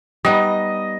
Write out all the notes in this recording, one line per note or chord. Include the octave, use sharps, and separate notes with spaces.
G3 B3 D#4 D#5